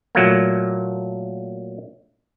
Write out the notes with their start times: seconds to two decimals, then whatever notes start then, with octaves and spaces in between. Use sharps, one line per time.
0.15 A#2 F#3 A3 A#3